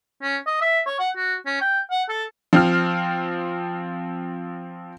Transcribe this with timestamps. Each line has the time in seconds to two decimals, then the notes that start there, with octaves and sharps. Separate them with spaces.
0.22 C#4
0.47 D#5
0.61 E5
0.86 C#5
0.99 F#5
1.17 F#4
1.46 C#4
1.61 G5
1.91 F#5
2.09 A4
2.53 F3 C4 F6